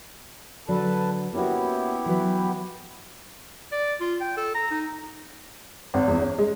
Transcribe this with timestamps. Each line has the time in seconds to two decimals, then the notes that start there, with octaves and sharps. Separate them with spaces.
0.68 D3 F#3 D4 A4 B4 A5
1.33 A#3 B3 C#4 E4 F#4 G4
2.06 E3 F#3 B4
3.72 D5
4.00 F4
4.21 G5
4.37 A4
4.55 A#5
4.71 D#4
5.94 G#1
6.08 E2
6.22 C#4
6.38 G#3